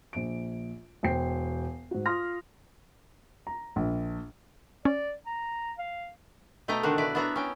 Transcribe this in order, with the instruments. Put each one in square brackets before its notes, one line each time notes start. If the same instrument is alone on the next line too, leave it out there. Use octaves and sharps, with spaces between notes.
[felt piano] A#1 D7
E1 C5 G5 C7
G#2 F#4
F4 C6 D#6 F6 A#6
[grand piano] A#5
A#1
[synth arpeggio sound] C#4 [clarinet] D5
[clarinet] A#5
F5
[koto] B2 A3 D#5 G5 A#5
D3 D#3 D4 F#4
E4 B4 D5
B3 D4 E4 F#4 C#5 A#5
C#4 G5